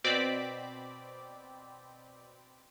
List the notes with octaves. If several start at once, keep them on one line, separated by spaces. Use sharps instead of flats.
B2 C4 D5 B5 D6